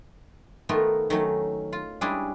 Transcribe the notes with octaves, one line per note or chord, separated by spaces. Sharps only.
D#3 A3 B3 F4 A#4
D#3 F#3 A3 C#4
F4
G3 G#3 C#4 D4 E4 G#4